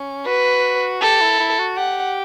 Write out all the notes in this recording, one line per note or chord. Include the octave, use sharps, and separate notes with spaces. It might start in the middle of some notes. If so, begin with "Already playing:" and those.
Already playing: C#4
F#4 B4
G4 A4
E4
E4
F#4
G4 F#5